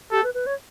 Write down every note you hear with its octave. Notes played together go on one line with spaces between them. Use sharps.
G4 A4
B4
B4
C#5